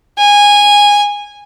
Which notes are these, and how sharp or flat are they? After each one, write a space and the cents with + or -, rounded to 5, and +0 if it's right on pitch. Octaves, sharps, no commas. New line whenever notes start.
G#5 -15